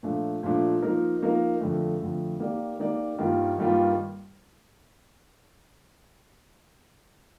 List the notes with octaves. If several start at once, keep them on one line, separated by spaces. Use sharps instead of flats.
A#2 F3 A3 D4
A#2 F3 A3 D4
F3 A#3 D#4 A#4
F3 A#3 D#4 A#4
F2 D3 A3
F2 D3 A3
D#3 A#3 D#4 G4 D5
D#3 A#3 D#4 G4 D5
G2 D#3 G3 A#3 F4
G2 D#3 G3 A#3 F4